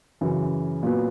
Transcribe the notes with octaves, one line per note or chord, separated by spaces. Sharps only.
F#2 C#3 E3
A#2 F#3 B3